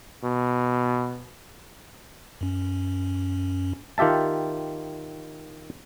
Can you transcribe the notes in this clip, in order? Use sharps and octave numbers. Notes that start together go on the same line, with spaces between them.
B2
F#2 C#4
D#3 F4 G4 E5 A5